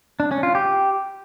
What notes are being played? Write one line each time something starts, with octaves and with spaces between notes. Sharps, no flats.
D4
C#4
F4
G4